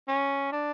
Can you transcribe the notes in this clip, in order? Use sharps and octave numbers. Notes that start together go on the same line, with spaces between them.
C#4
D4